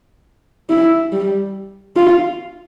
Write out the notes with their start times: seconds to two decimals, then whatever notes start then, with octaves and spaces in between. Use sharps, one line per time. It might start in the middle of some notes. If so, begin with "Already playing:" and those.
0.70 E4
1.12 G3
1.96 F4